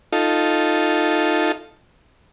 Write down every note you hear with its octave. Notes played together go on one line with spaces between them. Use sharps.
D#4 F4 A4